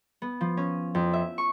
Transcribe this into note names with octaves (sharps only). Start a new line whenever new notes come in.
B3
F3
C#4
F2
E5
C#6